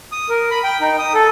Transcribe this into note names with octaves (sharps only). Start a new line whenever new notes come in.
D#6
A#4
B5
G5
D#4
D#6
A4